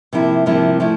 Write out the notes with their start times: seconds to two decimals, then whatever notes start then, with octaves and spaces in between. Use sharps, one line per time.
0.13 C3 F3 A#3 E4
0.46 C3 F3 A#3 E4
0.80 F3 A3 E4